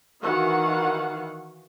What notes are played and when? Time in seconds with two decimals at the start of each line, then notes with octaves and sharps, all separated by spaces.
0.22 D#3 E3 F#4 F5 F#5